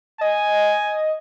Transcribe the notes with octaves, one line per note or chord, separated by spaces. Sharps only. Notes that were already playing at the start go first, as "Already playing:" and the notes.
D#5 G#5